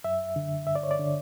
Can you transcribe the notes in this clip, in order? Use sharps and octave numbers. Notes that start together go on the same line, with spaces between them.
F#2 E5
D3
G2 E5
D5
C#5
D5
D3